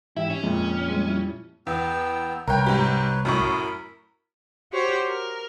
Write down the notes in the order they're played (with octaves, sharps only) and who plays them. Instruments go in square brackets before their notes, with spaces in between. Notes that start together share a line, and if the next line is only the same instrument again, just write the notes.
[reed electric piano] G#2 E3 G4 [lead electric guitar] E4 [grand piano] E5
[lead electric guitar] C#4
[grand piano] F2 A#2 [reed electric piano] G#3
[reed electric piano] G3 G#3 B3
G3 E4
[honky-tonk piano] E2 [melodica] B3 G5 E6
[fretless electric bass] C2 [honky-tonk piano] A#4 G5 [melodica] B4 C#5
[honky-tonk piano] G#2 G4 A#5
[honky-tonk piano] F#2 A2 C#6 [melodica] A#4 B5
[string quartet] F#4 G4 C5 C#5
A#4